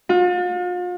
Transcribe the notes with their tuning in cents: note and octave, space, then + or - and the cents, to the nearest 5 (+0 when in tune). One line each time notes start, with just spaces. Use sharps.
F4 +40